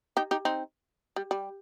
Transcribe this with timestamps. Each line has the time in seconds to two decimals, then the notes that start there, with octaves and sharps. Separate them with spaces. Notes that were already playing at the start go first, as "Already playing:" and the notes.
0.17 D#4 G4
0.31 D#4 G4
0.45 C4 D#4
1.16 G3
1.31 G3